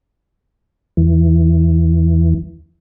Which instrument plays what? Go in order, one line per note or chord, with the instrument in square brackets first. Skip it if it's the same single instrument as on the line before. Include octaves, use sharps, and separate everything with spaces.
[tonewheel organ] E2 E3